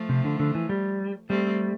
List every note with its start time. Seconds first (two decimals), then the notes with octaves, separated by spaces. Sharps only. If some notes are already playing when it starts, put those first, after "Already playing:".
Already playing: F3 A3
0.09 C3
0.24 D3
0.39 D3
0.55 E3
0.69 G3
1.29 G3 A3 C4